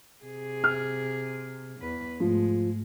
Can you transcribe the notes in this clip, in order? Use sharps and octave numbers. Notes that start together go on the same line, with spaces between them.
C3 G#4
F6
E2 B4
G#2 F3 G#3 A3